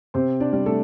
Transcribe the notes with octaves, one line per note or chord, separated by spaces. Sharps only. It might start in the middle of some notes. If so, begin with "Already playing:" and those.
C3 C4 C5
D4 D5
G3
A3 A4